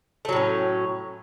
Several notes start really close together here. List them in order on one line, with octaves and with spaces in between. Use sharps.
A3 F#3 A2 C#4